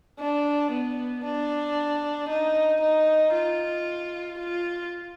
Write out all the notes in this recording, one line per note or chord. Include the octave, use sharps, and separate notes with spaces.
D4
B3
D4
D#4
D#4
F4
F4